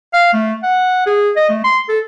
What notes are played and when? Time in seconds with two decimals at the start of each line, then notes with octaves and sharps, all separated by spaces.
0.13 F5
0.33 A3
0.63 F#5
1.06 G#4
1.36 D#5
1.49 A3
1.64 C6
1.89 A4